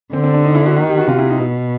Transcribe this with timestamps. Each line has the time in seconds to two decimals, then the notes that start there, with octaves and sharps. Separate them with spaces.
0.13 D3 C4
0.24 C4
0.34 D4
0.45 D#4
0.55 E4
0.66 F#4
0.76 D#3 F#4
0.87 G4
0.98 F#4
1.08 C3 F4
1.19 E4
1.30 D#4
1.39 B2